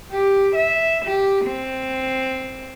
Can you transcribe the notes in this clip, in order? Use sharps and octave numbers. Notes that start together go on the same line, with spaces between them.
G4
E5
G4
C4